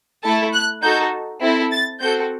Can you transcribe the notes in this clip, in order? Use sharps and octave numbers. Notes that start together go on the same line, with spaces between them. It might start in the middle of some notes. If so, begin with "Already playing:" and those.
A3 E4 A4 A5
F#6
D#4 F#4 A4 G6
C4 E4 A4
A6
C4 F#4 A4 G6